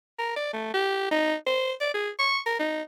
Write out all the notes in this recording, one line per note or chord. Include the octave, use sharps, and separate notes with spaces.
A#4
D5
A3
G4
D#4
C5
D5
G#4
C#6
A#4
D#4